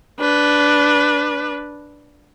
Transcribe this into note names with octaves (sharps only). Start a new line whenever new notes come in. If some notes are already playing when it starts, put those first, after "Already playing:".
D4 B4